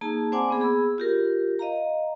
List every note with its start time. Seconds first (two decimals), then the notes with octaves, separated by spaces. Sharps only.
0.01 A#3 D#4 G#4 A5
0.32 C4 C5 D5 F#5 G#5 D6
0.48 A#3 B3 G#4
0.61 G#4 B5 E6
0.98 F4 G4 A#4
1.59 D#5 F5 A#5